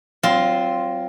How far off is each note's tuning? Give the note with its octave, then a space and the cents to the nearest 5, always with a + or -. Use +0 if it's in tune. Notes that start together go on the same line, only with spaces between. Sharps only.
F#3 +30 C4 +0 F4 +0